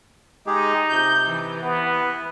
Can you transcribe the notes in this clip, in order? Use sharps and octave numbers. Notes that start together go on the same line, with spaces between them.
G#3 D#4 G4 G#4
C3 G6
E3
B3
B4